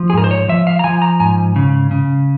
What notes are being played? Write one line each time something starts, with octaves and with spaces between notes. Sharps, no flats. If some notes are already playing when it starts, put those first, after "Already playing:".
Already playing: F3
G#4
G#2 A#4
C5
C#5
F3 E5
F5
A#5
F3 G#5
A#5
G#2 G#5
C#3
C#3